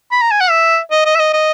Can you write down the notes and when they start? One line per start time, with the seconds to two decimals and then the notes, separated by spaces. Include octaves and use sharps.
0.12 B5
0.21 A#5
0.31 G#5
0.41 F#5
0.50 E5
0.91 D#5
1.05 D#5
1.15 E5
1.19 D#5
1.33 D#5